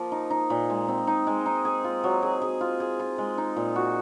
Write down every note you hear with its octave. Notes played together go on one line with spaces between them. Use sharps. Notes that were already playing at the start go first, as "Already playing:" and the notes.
Already playing: F3 A#3
D#4
D#4
A#2
G#3
C4
D#4
G#3
D#4
G#4
F4
F#3
G#4
G#4
F4
G#4
F4
G#3
D#4
A#2
F#4